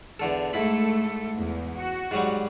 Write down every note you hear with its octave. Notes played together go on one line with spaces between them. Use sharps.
E2 D3 A4
G#2 A3 E4 A4 B5
E2
F#4
G#2 F#3 G3